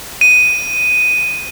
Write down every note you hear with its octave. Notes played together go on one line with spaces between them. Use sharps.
D#7